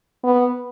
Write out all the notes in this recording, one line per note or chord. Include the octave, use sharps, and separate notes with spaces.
B3